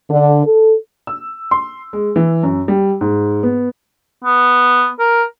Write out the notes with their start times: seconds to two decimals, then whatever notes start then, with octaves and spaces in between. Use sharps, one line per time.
0.10 D3
0.45 A4
1.07 E6
1.51 C6
1.93 G#3
2.16 E3
2.43 F#2
2.68 G3
3.01 G#2
3.43 B3
4.25 B3
4.99 A#4